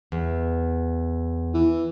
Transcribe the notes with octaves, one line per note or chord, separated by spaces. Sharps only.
E2
E3